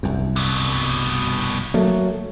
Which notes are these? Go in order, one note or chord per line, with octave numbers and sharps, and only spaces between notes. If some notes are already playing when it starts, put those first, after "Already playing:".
C2 F#2
G2 B2
F#3 A3 A#3